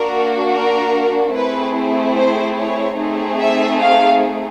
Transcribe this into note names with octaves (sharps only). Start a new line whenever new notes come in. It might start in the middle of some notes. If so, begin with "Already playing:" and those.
Already playing: A#3 D4 F#4 A#4
A#4
A3 C4 E4 G#4 B4
C5
C#5
A3 C4 D#4 G#4
E5
F5